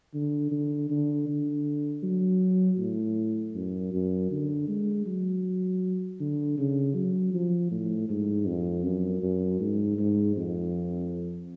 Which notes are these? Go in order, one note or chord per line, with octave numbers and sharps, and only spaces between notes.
D3
D3
D3
D3
F#3
A2
F#2
F#2
D3
G#3
F#3
D3
C#3
F#3
F3
A2
G#2
F2
F#2
F#2
G#2
G#2
F2